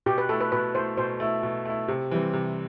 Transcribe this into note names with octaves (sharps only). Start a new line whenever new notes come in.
B2 G4
B4
A3 E4 A4
B4
B2 B4
A3 E4 C5
B2 C5
A3 E4
B2
A3 E4
C3
E3 G3 C4
C3